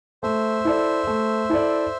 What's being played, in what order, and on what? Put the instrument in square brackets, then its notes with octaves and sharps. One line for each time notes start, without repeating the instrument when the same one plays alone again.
[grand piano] A3 [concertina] C5 E5
[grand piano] E4 A4 D5
A3
E4 A4 D5